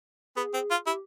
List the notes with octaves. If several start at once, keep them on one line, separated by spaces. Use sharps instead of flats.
B3 G#4
C4
F4
E4 G4